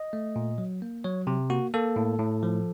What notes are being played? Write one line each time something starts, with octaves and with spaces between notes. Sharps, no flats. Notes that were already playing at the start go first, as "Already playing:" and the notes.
Already playing: D#5
A3
A#2
F#3
A#3
F#3 C#5
C3
A#3 F#4
A#3 A4
A2
A2
F3